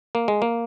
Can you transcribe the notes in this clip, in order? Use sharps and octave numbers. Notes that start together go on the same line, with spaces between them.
A#3
G#3
A#3